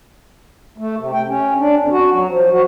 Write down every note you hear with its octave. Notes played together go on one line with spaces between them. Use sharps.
A3
C3
G5
C#4
D4
F2
F#4
F#3
F3
F#4